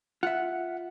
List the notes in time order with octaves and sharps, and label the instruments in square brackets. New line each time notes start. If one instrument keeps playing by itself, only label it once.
[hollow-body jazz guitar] F4 E5 [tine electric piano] F#5